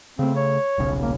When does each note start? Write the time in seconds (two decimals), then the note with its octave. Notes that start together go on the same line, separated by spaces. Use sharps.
0.19 C#3 A3 C4
0.37 C#5
0.78 D#1 B1 C#3
1.02 A#3